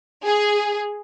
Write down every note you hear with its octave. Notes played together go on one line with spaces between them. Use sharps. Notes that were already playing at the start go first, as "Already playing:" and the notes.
G#4